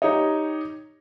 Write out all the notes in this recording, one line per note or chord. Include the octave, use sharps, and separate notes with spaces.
D#4 G4 C#5 D#5